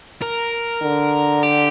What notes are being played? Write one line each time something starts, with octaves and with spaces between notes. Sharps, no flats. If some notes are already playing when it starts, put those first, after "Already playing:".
A#4
D3
G4